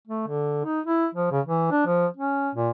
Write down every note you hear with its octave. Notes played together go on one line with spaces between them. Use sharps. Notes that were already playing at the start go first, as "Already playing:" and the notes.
A3
D3
D#4
E4
F3
C#3
E3
D4
F3
C#4
A#2